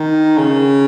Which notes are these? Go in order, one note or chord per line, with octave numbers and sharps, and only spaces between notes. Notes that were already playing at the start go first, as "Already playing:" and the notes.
Already playing: D#3
C#3